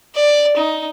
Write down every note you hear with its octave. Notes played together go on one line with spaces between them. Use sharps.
D5
D#4